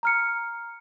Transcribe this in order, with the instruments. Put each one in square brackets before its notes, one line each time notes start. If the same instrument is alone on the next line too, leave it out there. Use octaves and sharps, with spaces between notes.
[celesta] A#5 F6 C#7